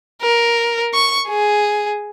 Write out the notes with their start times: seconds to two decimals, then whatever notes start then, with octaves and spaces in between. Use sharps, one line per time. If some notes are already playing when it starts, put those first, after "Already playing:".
0.22 A#4
0.94 C#6
1.28 G#4